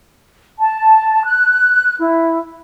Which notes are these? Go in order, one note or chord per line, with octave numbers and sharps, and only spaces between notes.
A5
F#6
E4